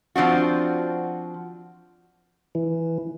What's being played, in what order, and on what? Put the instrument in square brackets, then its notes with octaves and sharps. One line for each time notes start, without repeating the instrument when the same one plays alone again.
[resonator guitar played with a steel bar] F3 C4 D4 F#4
[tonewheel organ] E3